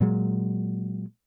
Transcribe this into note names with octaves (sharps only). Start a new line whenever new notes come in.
A#2 F#3 G#3